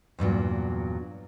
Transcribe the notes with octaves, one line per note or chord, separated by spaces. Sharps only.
E2 G2 A#2 F#3